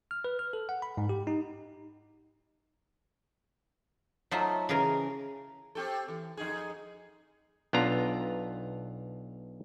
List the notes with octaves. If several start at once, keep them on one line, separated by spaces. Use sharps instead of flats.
F6
B4
F6
A4
F#5
B5
G#2
G4
D#4
F#3 A3 D#4 F4 C5 E5
C#3 E3 G#4 A#4
C4 G4 A4
E3
F2 D#4 G#4
B1 B3 D4 F4 A#5